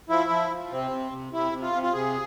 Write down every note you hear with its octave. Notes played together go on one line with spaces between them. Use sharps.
F3 E4
F3
F3
C3 C4
C3
C3
C3 E4
C3
F4
C3
F4
C3 G#4